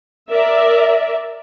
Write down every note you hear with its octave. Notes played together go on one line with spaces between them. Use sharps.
A#4 D5 E5